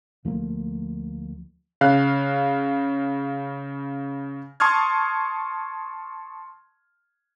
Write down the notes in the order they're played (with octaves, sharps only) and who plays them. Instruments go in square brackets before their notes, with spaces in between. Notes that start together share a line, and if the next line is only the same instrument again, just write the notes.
[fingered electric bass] D2 F3 A3 A#3
[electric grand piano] C#3 F5 F#6
A5 C6 C#6 D#6 F6 G#6